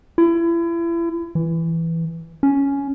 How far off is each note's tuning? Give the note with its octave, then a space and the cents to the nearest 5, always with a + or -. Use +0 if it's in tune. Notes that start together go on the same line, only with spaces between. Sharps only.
E4 +35
E3 +0
C#4 +10